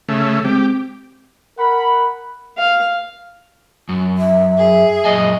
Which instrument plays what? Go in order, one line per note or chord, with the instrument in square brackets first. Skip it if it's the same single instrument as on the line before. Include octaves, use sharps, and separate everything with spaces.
[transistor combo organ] C#3 A3
[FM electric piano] G#3 C4 [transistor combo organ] G4
[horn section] A#4 F#5 B5
[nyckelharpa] F5
[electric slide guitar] F#2
[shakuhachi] E5
[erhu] G#4
[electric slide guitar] F#2 A#2 G#5 [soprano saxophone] D#5